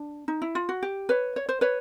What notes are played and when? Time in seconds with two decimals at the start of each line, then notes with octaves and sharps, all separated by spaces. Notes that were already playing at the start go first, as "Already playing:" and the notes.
Already playing: D4
0.28 D#4
0.42 E4
0.55 F4
0.69 F#4
0.83 G4
1.09 B4 C#5
1.36 C#5
1.49 C5
1.61 B4 C#5